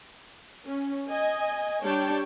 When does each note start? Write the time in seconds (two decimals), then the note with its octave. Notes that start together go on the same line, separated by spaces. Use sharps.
0.65 C#4
1.10 D#5 G#5
1.85 G3 D4 C#5 G5 A5